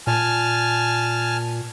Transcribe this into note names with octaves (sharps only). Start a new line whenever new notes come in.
A#2 G#5 A5 F6